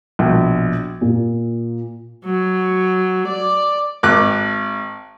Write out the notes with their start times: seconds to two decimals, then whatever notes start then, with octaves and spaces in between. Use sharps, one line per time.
0.19 A#1 B2
1.01 A#2
2.25 F#3
3.27 D5
4.03 G#1 D6 F#6